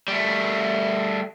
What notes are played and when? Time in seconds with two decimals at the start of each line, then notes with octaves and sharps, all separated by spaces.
0.08 G3 A3